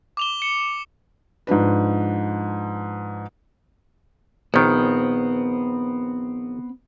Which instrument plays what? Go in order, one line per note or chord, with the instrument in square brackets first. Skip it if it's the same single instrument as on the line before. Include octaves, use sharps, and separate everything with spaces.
[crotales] D6 F7 G7
C#7
[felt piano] G#2 F3 D4 B4
[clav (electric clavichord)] A#1 D#3 [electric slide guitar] B3 C4